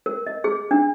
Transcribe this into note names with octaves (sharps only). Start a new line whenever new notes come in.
A#4
D#5
G#4
D4